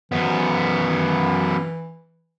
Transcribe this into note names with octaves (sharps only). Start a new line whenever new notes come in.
F#2 E3 B3